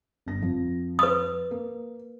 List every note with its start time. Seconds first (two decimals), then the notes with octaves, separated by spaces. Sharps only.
0.26 G1 A#6
0.42 F2 F3
0.99 B4 D#6
1.51 A#3